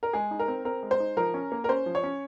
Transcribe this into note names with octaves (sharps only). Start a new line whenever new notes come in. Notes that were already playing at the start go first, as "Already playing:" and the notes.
A#4
G#3 G#4
D#4
A#4
C4
C4 A#4
G#3
C5
D#4
F3 A#4
C#4
A#3
A#4
C#4 C5
F3
C#5
C#4